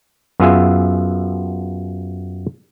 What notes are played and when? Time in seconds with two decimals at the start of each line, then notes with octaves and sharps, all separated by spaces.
0.40 F#2 B3 F4 G#4 E5 G#5